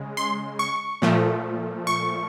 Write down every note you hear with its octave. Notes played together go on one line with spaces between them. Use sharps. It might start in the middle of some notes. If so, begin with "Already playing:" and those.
Already playing: C#3 G#3
C6
C#6
A#2 F3 A3
C#6